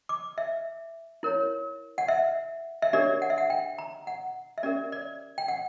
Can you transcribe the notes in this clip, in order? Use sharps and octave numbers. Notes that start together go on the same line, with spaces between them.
D6
E5
E4 A#4 C#5
F#5
E5
E5
D4 G4 A#4 C#5 D5
F#5
E5
F#5
G5
A#5
F#5
E5
C#4 G4 A#4 D5
D5
G5
F#5